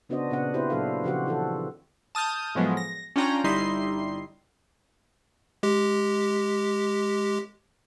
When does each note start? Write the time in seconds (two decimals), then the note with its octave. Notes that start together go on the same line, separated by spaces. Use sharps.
0.09 C#3 B3 D4 F#4 C5 D#5
0.30 A#2 C#3 B3 D4 F#5
0.54 C4 E4 F#4 G4 B4 C5
0.70 A#2 F#3 D4 F#4 A4 F5
1.04 C#3 F3 F#4 G4 C5 F#5
1.26 E3 F#4 A4
2.15 A5 D#6 F6 G6
2.55 A2 F3 F#3 G#3 B3
2.77 A#6
3.16 C#4 D4 F4 G5 A#5
3.44 G1 G3 D#4 E4 C6 C7
5.63 G#3 G4